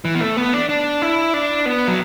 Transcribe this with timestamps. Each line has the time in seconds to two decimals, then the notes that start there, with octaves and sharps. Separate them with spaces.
0.05 E3
0.15 B3
0.21 A3
0.37 B3
0.53 D4
0.69 D4
1.02 E4
1.34 D4
1.66 B3
1.88 F#3